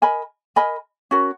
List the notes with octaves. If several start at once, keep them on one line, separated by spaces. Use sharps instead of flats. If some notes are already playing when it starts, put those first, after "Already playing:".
A#4 D#5 G#5 B5
A#4 D#5 G#5 B5
C#4 F#4 A#4